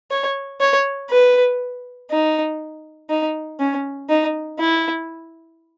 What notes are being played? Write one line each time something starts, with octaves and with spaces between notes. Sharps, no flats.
C#5
C#5
B4
D#4
D#4
C#4
D#4
E4